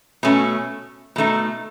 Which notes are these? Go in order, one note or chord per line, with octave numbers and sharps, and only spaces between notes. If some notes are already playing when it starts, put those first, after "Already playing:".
B2 A3 C#4
B2 A3 D#4